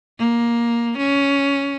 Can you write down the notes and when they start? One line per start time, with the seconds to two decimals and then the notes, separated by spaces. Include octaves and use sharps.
0.19 A#3
0.97 C#4